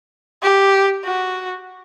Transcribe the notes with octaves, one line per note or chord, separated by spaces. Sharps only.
G4
F#4